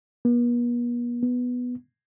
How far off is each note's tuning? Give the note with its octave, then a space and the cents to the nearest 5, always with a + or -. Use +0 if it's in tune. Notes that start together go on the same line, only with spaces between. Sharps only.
B3 -45
B3 +0